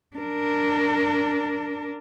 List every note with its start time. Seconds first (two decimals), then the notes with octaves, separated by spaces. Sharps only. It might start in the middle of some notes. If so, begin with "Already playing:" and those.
0.17 D4 A#4